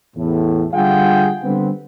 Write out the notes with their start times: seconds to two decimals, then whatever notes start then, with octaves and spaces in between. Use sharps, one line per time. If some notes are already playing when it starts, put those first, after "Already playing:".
0.16 E2 A2
0.74 D3 G3 F4 G#4 F#5 G5
1.43 D3 G3 B3 C4